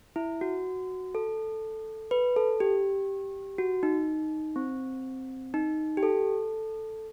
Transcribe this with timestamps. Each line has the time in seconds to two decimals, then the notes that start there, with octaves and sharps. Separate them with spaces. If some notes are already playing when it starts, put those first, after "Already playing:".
0.16 E4
0.41 F#4
1.15 A4
2.11 B4
2.36 A4
2.60 G4
3.58 F#4
3.83 D#4
4.56 C4
5.54 D#4
5.97 G4
6.03 A4